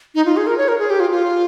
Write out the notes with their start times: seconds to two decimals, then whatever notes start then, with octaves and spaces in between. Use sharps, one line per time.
0.15 D#4
0.25 F4
0.37 G#4
0.47 A#4
0.58 C#5
0.68 A#4
0.79 G#4
0.90 G4
1.00 F4
1.11 F4